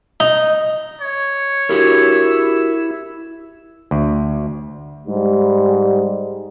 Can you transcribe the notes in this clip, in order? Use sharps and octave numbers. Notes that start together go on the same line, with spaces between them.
D#4
C#5
E4 F#4 G4 A#4
D2
G#2 G3